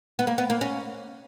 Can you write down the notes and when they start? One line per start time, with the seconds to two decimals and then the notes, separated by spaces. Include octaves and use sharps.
0.19 B3
0.27 A#3
0.38 B3
0.50 A#3
0.61 C#4